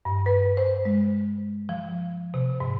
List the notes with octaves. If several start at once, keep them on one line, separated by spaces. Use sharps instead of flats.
G2
B4
C5
G#3
F3
C3
G#2